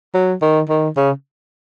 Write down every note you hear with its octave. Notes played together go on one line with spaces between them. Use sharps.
F#3
D#3
D#3
C#3